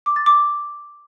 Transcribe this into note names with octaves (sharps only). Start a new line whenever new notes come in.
D6
A6
D6